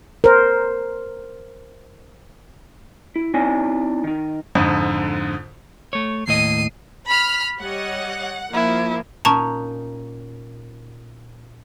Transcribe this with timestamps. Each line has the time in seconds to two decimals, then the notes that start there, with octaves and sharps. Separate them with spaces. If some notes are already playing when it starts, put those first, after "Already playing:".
0.24 A#4 C5
3.16 E4
3.34 C4 D#4 E4 C#5 D5 G#5
4.04 D#3 D#4
4.55 F2 G#2 D3
5.93 A3 C#5
6.28 D#2 A2 D#5 C7 D#7
7.08 B5 F6
7.61 G3 C#5 D#5 F#5
8.53 F3 A#3 E4
9.25 A#2 C#4 D#4 A5 A#5 C#6